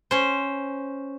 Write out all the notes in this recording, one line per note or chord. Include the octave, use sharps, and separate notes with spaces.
C#4 C5